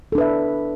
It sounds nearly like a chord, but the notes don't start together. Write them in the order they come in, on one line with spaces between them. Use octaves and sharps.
A4 D4 B4 E5